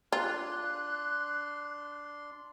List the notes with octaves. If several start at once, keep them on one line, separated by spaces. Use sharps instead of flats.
D4 F4 C6 F#6